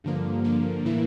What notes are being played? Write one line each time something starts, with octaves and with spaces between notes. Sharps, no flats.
G2 D3 F3 A#3
G2 D3 F3 A#3
A2 E3 A#3 E4